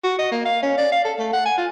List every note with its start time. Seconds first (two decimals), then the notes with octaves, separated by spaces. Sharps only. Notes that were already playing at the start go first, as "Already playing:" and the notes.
0.04 F#4
0.19 D#5
0.32 A#3
0.45 F5
0.63 C#4
0.78 D5
0.92 F5
1.05 A4
1.19 A3
1.33 F#5
1.46 G#5
1.58 F4